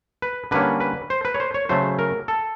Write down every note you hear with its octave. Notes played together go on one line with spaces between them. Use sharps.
B4
D3 G3 A#3 C#4 B4
B4
C5
B4
C#5
C5
C#5
C#3 F#3 A3 C5
A#4
A4